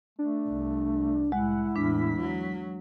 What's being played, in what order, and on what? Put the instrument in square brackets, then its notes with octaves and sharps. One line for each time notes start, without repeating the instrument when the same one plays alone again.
[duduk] A3 [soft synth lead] D4
[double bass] C2
[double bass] C2 A2 [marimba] G#3 [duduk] E4 [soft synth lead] F#5
[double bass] E2 A2 [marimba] D4 [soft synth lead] B6
[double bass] F#3